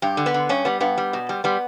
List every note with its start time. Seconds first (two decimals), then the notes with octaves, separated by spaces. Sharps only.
0.02 G2 G4
0.17 D3
0.26 B3
0.34 D3
0.49 G2 C#4
0.65 G3 B3
0.80 G2 B3
0.98 G3
1.13 B2
1.29 G3
1.44 G3 B3